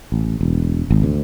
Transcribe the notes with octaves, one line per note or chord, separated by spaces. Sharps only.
A1
E1
G#1
D2